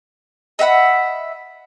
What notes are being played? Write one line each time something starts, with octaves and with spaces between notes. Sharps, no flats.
D#5 E5 F#5 B5